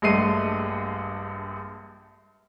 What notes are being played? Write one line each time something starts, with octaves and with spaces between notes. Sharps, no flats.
A#1 G2 G#3 A3 C7 D#7